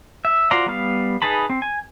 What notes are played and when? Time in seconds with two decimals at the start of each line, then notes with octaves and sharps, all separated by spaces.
0.25 E5
0.51 F4 F#4 C5 D5 A#5
0.66 G3 B3 F5
1.22 D#4 G#4 B4 A5 B5
1.50 C4
1.62 G#5